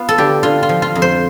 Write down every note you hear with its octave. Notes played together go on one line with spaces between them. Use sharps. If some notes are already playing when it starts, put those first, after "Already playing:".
Already playing: B3 F4
A4
D3 G4
D3 F4
F4
F3
F4
F2
C5